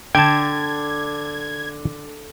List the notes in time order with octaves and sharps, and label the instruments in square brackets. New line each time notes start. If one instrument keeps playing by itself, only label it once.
[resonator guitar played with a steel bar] D3 [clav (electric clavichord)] G5 A5 [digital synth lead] G#6